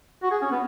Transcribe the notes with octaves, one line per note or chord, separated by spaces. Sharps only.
F#4
G#4
C#4
B3